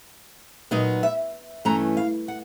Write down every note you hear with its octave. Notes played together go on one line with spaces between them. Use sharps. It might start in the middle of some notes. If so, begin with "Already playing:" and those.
A#2 F#3 B3 D#4 D#5
E5
G2 E3 A3 C#4 A#5
F5
F#5